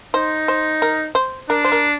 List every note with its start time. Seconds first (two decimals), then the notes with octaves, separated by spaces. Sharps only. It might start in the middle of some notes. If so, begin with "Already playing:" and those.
0.14 D#4 C5
0.48 C5
0.82 A#4
1.15 C5
1.49 D4 A#4
1.64 C5
1.72 A#4